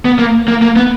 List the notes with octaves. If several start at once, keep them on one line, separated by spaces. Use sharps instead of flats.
B3
A#3
A#3
A#3
B3